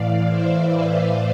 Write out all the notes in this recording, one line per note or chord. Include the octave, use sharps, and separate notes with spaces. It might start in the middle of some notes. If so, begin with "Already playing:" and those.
Already playing: A2 E3 D5 F5
C5 E5
B4 D5